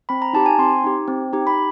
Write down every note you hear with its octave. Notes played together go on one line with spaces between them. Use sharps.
C4 B5
A#5
D#4 G4 A5
G#5
C4 C6
D#4 G4
C4
D#4 G4
B5